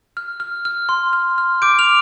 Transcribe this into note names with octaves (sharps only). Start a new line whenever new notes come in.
F6
F6
F6
C6
F6
F6
D6 G6 D7
F6 F7